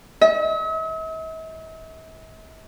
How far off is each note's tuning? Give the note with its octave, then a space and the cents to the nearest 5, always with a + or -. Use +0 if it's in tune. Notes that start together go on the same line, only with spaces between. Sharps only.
E5 -45